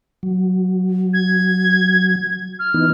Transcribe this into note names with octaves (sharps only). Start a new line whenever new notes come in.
F#3
G#6
F6
E3 B3 D#4